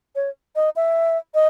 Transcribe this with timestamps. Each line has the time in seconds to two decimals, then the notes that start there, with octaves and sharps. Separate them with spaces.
0.16 C#5
0.56 D#5
0.76 E5
1.34 D#5